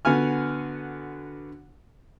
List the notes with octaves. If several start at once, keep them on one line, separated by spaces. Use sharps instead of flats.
D3 B3 F#4 G#5 F6